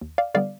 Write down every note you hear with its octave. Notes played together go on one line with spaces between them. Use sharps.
D#2
D5 F5
D3 G3 B3 D5 F5